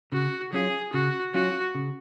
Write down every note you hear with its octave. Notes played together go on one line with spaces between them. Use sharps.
C#3 F#4
F#3 C#4 F4 G#4
C#3 F#4
F#3 C#4 F4 F#4
C#3